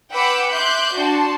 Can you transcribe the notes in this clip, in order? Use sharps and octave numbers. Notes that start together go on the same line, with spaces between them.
B4 F#5 G5 B5 D6 E6
E5 C6 D6 F#6 G6
D4 F#4 G5 A5 C6